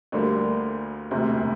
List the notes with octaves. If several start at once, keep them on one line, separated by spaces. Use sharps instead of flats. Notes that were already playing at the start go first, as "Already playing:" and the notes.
D2 D3 G3 A#3
E1 D2 C3